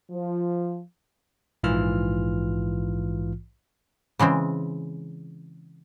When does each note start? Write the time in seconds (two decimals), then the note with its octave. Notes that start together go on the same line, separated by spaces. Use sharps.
0.11 F3
1.63 A#1 G#2 E3 F4 F6
4.19 C#3 E3 G#3 C4